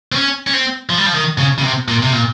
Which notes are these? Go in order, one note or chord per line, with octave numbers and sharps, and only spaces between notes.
C4
C#4
C#4
C4
F3
G3
F3
D#3
C#3
C#3
C3
A#2
C3
A#2